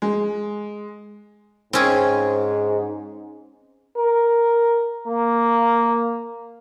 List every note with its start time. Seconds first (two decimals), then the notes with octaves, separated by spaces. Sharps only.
0.02 G#3
1.73 G#2 C4 C#4 G#4
3.97 A#4
5.07 A#3